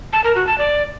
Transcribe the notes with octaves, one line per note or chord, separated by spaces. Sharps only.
A5
A#4
F#4
A5
D5